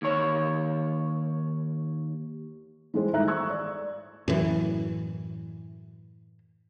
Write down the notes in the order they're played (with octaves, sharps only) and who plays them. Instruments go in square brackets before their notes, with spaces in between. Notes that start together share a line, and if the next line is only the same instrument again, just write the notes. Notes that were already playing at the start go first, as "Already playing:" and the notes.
[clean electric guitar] D#2 C#5
[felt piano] E3 G3 G#3 G#4 C5
G#2 D#3 A4 E5 A#5 F#6
C#6 E6 F#6 G#6
D5
[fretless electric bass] F#2 A2 E3